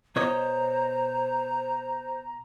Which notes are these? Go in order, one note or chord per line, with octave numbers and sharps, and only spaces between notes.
B2 C5 C#5 D#5 A#5